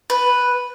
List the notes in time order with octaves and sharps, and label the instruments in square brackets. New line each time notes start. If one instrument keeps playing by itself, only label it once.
[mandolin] B4